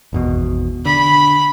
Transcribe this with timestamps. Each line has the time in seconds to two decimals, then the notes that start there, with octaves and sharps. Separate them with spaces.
0.13 G#1 E2 B2
0.86 D3 B5